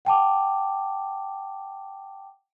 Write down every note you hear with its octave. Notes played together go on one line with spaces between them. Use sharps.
F#5 G5 A5 D6